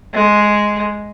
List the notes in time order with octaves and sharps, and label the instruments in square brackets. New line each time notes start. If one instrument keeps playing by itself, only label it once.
[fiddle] G#3